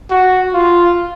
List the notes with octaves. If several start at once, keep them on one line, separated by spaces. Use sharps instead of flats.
F#4
F4